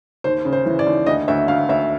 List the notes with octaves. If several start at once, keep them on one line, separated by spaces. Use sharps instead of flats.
D#2 C5
C#3
C5
E3
D5
D#2
D2 D#5
D2 E5
D2 F5
D2 E5